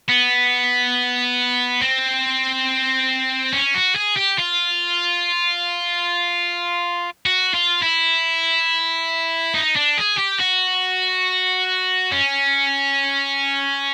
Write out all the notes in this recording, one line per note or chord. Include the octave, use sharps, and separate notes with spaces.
B3
C4
C#4
F#4
G#4
G4
F4
F#4
F4
E4
D#4
D4
G#4
G4
F#4
C#4